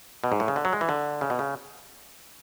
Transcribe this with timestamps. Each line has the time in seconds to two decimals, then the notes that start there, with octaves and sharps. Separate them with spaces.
0.24 B2
0.32 G#2
0.40 A2
0.48 C#3
0.56 D3
0.65 F#3
0.73 G#3
0.81 E3
0.89 D3
1.21 C#3
1.30 B2
1.39 C#3